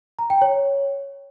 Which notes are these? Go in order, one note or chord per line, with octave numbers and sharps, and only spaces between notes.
A#5
G5
C#5